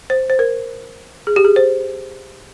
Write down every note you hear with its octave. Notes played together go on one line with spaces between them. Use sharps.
C5
C5
A#4
G#4
G4
G#4
C5